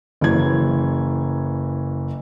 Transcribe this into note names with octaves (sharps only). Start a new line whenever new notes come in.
F#1 E3 F#3 G#6